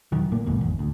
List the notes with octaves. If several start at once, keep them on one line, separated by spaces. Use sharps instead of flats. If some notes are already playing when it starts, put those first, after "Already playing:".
F1 D#3 F#3
A#1 A2 A#3
F#1 D#2 G#2 B2
G#1 E2
D2